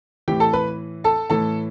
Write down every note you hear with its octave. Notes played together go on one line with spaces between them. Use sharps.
A2 E3 G4 G5
A4 A5
B4 B5
A4 A5
A2 E3 A4 A5